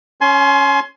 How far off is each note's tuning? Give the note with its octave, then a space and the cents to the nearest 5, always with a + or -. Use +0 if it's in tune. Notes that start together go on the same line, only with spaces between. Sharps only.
C#4 +0 G#5 +35 C6 +0